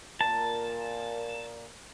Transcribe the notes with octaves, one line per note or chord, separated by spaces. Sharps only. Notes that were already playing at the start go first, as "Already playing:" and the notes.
A#2 A#4 A5